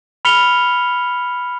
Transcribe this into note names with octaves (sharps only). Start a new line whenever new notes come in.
B5 F6 B6 C#7 F7 G7